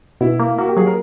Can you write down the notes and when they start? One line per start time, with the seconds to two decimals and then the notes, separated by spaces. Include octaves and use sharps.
0.21 B2 E4
0.39 A#3
0.58 A#3 F#4
0.68 G4
0.77 F#3 G#4
0.86 A#4